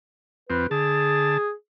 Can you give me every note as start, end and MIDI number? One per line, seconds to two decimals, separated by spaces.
0.50 0.67 41
0.50 0.67 60
0.50 0.65 71
0.71 1.38 50
0.71 1.52 68
0.71 1.38 81